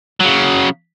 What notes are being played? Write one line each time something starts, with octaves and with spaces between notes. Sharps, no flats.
C#3 F#3